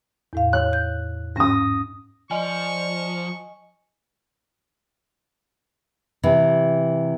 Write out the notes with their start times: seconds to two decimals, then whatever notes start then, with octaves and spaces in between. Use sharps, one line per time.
0.33 E2 A2 F5
0.53 C#5 F#6
0.73 G6
1.36 G#2 C#4 D#6 A#6
2.31 F3 D5 D#5 G#5 C#6
6.23 C3 E3